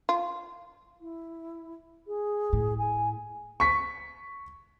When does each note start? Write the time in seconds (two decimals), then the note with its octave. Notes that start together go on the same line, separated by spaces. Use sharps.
0.09 F4
1.01 E4
2.07 G#4
2.53 A2
2.78 G#5
3.60 C#6 B6